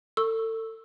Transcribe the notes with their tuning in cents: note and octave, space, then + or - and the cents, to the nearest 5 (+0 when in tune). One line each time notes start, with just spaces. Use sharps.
A4 +30 C#6 -10 E6 +0